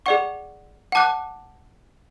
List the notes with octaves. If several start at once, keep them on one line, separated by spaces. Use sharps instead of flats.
G#4 D5 F#5 C#6
F#5 A5 D6 F#6